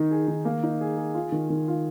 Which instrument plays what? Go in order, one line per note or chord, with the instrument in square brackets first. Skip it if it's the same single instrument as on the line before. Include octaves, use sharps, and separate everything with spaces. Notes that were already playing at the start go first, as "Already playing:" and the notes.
Already playing: [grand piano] D#3 D#4
G#4
D#3
A#3
D#4
G#4
G#4
F4
D#3
D#3
F4